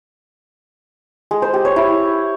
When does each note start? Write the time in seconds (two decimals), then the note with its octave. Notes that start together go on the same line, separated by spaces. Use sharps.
1.31 G#3
1.42 C5
1.54 G4
1.65 C#5
1.76 E4